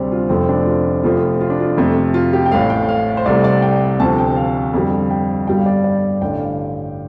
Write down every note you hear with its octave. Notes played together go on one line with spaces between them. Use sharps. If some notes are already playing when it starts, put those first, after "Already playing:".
Already playing: D2 C3 G3 C4 D4
F4
F1 F2 F3 A3 C4
D4
F4
F1 F2 F3 A3 F4
F4
D4
F4
F2 C3 A3
F4
G4
G5
A1 A2 A3 F5
G5
F5
C5
C2 C3 A3 D5
D5
G5
D2 C3 F3 A5
G5
F5
F2 D3 G3
G5
G1 G2 G3 G5
F5
D5
D5
A1 G2 D3 G5
F5